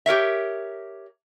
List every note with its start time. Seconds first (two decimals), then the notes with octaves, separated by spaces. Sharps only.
0.06 G4 A#4 C#5 E5